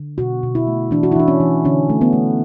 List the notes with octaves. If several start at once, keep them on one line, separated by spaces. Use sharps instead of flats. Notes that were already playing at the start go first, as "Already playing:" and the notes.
Already playing: D3
B2 F#4
B2
E4
A3
E3 D4
F#4
E4
E3 D4
C#4
E3
D3 C#4
A3
B3
A3